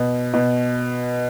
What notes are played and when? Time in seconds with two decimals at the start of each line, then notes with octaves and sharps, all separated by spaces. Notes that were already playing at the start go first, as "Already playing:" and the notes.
Already playing: B2
0.34 B2